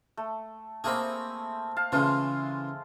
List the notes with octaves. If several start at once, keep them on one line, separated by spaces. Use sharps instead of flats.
A3
A3 A#3 C4 G#4 D#5 B5
F5 A5
C#3 E3 G#3 A3 F4